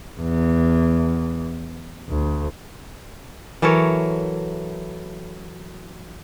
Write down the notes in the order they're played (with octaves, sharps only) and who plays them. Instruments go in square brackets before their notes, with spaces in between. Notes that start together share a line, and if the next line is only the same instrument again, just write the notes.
[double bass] E2
D2
[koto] E3 F#3 A4 A#4 C#5